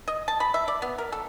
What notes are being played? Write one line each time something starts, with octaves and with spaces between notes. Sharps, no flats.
D#5
A5
B5
E5
D5
B3
A#4
A4